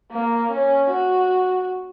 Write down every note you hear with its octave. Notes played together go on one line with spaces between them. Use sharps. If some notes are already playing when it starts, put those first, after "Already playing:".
A#3
C#4
F#4